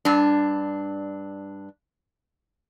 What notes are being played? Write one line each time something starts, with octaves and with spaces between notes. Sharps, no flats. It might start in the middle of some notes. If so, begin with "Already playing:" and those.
G2 D4